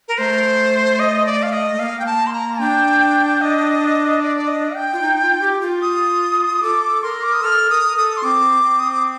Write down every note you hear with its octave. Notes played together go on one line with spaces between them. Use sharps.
A#4
A3 C5
D#5
D5
F5
D#5
A3
A#3 F5
G5
A5
C6
A#5
D4 G5
D#5
D5
D5
D#5
G5
F4
D#4
F4
G4
F4
D#6
A4 D6
A#4 C6
D6
D#6
A4 F6
A#4 D#6
A4 D#6
C6
C4 D6
D#6
D6